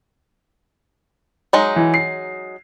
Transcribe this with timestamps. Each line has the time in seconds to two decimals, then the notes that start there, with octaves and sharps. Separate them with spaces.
1.53 F#3 G#3 D#4
1.76 E3
1.94 C7